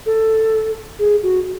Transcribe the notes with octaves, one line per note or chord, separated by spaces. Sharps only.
A4
G#4
F#4